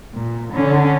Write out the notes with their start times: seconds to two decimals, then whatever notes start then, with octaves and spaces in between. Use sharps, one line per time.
0.14 A#2
0.53 D3 C#4